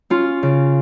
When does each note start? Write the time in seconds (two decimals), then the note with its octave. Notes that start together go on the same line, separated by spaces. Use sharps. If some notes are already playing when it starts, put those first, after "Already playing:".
0.10 C#4 F4
0.43 C#3